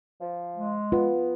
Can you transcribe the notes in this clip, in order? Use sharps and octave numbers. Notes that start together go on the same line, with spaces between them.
F3
G#3
B3 F4